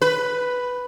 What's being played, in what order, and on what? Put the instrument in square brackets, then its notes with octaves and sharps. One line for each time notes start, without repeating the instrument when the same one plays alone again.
[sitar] B4